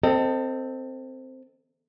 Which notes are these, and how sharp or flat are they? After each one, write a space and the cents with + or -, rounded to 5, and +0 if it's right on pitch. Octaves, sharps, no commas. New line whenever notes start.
C4 +0 A4 +30 D#5 -5